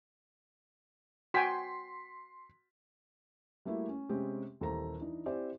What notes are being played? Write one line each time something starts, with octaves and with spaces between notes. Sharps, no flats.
F#4 G5 G#5 C6 B6
G3 A3 A#3 E4 F#4
C#4
C3 G#3 C4 C#4 G4
D#1 D#2 E3 A4 C5 A#5
E3 D4 D#4
C4 E4 G4 C5 D5 G#5